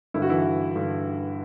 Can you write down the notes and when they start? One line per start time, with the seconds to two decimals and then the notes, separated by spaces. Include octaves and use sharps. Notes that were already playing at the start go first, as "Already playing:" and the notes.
0.14 G2 D3 E4
0.22 F#4
0.30 E3 E4
0.75 G2 D3